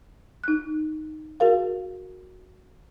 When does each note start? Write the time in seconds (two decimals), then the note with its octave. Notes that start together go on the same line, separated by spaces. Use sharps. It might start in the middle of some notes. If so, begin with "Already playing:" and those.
0.44 D#4 F#6
1.40 F#4 G#4 A#4 F5